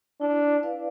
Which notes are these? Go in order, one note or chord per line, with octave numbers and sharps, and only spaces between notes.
D4 E4
B4 D5 F5